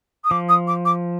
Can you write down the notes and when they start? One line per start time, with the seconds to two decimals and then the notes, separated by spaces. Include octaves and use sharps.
0.24 D#6
0.31 F3 D6
0.49 D#6
0.67 D6
0.85 D6